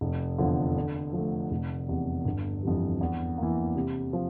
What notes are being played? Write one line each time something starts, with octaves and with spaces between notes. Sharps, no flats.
F1
E2 D3 F3
D3
F3 A3
F1
E2 C3
G1
F2 E3 G3
E2
E3 A#3
C3
F3